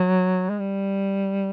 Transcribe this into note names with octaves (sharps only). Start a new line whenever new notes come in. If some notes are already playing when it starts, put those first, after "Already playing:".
Already playing: F#3
G#3
G3